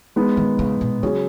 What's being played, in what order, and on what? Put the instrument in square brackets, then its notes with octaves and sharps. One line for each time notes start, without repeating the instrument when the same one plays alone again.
[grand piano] G#3 B3 D#4
[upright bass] D#3
C#3
B2
[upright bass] C#3 [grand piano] F#3 C#4 G#4 C#5